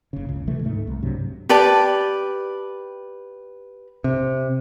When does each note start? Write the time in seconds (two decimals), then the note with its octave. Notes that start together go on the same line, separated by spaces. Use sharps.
0.13 F#1 C#3
0.29 C#2
0.47 C3 E3 A3
0.64 D2 G#2 A3
0.87 C2
1.02 G2 C3 F#3
1.49 G4 B4 D5 A5
4.04 C3